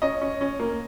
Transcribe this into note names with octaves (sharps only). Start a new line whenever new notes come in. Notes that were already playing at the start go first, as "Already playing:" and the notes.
C#4 D#5
C#4
C#4
A#3